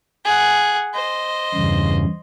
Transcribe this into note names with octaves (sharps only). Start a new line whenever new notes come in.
G#4 F#5
C5 D#5
E2 G2 C#3